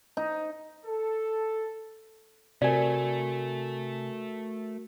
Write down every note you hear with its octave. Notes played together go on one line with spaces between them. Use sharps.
D#4
A4
C3 A3 F#4 A#4 D5 G#5